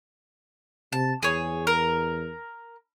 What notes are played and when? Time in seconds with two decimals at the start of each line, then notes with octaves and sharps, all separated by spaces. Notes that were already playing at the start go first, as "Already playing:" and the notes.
0.93 C3 A5
1.23 E2 G#4 C#5
1.67 A#4